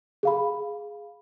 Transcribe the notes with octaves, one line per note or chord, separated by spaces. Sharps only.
G#4 F5 B5